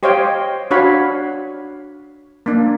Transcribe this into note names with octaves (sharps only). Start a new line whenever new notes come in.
G4 C5 C#5 D#5 F5 G5
D4 F#4 C#5 F5 F#5 B5
A#3 D4